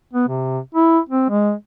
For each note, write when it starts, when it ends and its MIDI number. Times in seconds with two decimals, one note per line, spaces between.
0.13 0.28 59
0.28 0.59 48
0.75 0.99 64
1.09 1.29 60
1.30 1.52 56